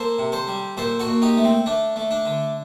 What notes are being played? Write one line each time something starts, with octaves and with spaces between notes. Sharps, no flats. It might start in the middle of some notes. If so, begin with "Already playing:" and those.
Already playing: A#3 A4 C5
C3
A4 C5
G3
A#2 A4 C5
F#4 A4
A#2
D#4 G4
A3
C4
A3 D4
A3
D4
D3